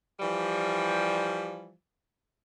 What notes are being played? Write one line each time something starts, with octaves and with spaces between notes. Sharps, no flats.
E3 F3 G3